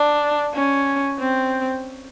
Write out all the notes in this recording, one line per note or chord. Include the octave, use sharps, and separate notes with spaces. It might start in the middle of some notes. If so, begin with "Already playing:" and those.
Already playing: D4
C#4
C4